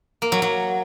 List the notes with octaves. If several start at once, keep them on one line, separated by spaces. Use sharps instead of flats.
A#3
F#3
F#3